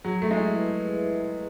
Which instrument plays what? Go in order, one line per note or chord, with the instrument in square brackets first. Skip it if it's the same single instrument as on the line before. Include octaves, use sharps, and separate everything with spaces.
[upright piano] F#3 [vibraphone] G#4
[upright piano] A3 [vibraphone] E5
[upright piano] G#3
[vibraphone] E4
B4